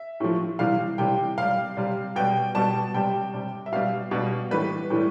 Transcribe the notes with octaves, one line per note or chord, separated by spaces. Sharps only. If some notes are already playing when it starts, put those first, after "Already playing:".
Already playing: E5
A2 F3
C3 E3 G3 F5
C3 E3 G3 G5
C3 G3 F5
C3 G3
B2 G3 G5
B2 G3 A5
C3 G3 G5
C3 G3
E5
B2 G3 F5
B2 G3
A2 E3 G3 B4
A2 E3 G3